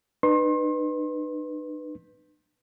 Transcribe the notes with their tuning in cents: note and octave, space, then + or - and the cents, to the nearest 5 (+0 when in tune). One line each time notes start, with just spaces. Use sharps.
D#4 -45 B4 +0 C6 +35